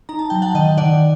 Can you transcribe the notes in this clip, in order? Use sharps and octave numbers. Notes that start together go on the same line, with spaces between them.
D#4 A#5
A5
F#3 G5
F#5 A5
D#3 D#5 G5
D#3 D5 F#5